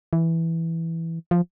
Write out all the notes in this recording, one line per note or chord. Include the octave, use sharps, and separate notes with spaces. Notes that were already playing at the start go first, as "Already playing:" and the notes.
E3
F3